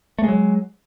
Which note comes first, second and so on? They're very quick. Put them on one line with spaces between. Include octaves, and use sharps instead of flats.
A3 G#3 F#3